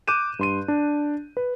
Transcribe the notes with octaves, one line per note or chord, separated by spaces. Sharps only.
D6 F#6 G6 D#7 E7
G2 C6 D#7
D4
B4